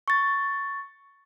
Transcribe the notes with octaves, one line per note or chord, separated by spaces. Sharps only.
C#6 A6